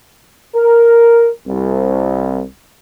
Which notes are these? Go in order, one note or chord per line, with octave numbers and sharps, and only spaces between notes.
A#4
C2